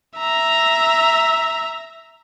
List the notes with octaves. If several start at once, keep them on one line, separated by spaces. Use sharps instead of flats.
E5 A#5